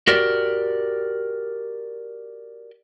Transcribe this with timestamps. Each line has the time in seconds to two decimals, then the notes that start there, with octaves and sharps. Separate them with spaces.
0.08 F#4 G4 A#4 D5